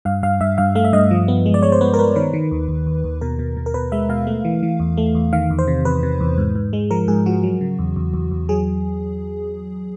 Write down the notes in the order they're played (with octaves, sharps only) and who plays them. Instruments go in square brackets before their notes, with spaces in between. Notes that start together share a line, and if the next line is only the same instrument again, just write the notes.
[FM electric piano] G2 F5
G2 F5
G2 E5
G2 F5
A3 F5
E5
G2 D#5
F3
B3
G#3
D5
G#3 C#5
C5
B3 B4
A#4
B3 B4
D#3 B4
D#3
D#2
D#2
D#2
D#2
B2 A#4
B2
B2
A#4
B2 B4
G#3 E5
B2 F5
A3
E3
E3
E2
A3
E2
D#3 F5
E2
C5
C3
E2 B4
C3
E2
G#2
G#2
G#3
F3 A#4
G#2 G#4
F3 F#4
F#3
C#3
E2
E2
E2
E2
F#3 G#4